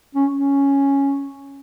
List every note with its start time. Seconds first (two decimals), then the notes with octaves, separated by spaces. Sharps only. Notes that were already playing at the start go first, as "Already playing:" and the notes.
0.15 C#4
0.37 C#4